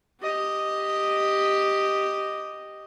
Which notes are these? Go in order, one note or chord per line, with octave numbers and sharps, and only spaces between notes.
G4 D#5